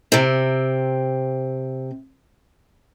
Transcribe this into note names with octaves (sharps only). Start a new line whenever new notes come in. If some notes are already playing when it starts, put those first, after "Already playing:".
C3 C4